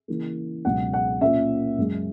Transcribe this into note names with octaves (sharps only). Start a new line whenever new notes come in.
C#3 E3 A#3
C#2 B2 F#3 C#4 F#5
F#5
A#2 A#3 C#4 E5
F#2 C#3 G#3